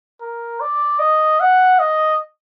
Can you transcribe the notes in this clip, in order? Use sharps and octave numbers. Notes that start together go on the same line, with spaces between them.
A#4
D5
D#5
F#5
D#5